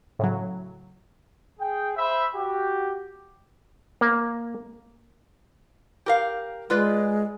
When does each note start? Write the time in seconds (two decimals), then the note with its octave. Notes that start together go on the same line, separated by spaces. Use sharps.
0.19 A2 C#3 F#3
1.59 G#4 G5
1.96 C5 E5 B5
2.33 F#4 G4
4.01 A#3
6.06 G4 A#4 F5
6.70 G#3 F4 B4 D5